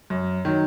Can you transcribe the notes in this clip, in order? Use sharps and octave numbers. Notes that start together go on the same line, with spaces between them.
F#2
D#3 F#3